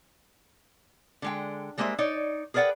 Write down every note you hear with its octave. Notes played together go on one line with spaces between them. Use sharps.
D3 G#3 G5
G3 G#3 A#3 C5 D#5 E5
D#4 C#5 D5
G#4 A#4 B4 D5 F#5 G5